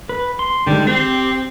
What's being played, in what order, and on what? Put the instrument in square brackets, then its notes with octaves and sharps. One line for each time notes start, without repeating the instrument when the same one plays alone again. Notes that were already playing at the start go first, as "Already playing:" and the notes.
[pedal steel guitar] B4
C6
[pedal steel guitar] D3 D#3 G#3 [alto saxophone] G3
[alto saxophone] C4 [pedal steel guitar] G4